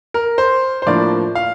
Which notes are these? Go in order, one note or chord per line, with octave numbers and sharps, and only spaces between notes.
A#4
C5
C5
A2 F3 A#3 D4 D5
F5